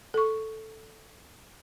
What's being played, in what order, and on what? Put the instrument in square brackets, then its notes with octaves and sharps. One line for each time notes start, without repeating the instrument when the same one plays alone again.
[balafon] A4 C#6